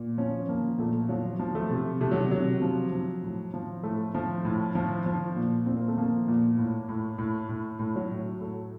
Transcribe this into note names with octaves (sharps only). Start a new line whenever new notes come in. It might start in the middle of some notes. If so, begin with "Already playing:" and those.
Already playing: A#2
F3 C#4
F3 A#3
A#2 A3
F3 F#3
F3
A3
C3
C3 A3
F#3
C3 F#3
F3
F3
A2
F3
A2 A3
F3
A2
F3
F3
A#2
A#2 C4
A#3
A3
F3 A#3
A#2
A2
A2
A2
A2
A2
F#3
A2
A2 A3